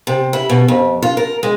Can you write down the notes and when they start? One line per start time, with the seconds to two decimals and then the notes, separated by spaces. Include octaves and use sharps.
0.07 C3
0.33 E4
0.50 B2
0.68 F2
1.02 F4
1.17 A#4
1.43 G#3